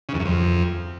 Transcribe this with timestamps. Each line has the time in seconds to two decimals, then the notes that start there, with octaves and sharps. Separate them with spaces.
0.09 C#3
0.14 E2
0.20 F#2
0.25 F2